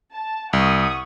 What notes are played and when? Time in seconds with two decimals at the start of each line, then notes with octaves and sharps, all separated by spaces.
0.13 A5
0.53 C2 F#5 C#6 D#6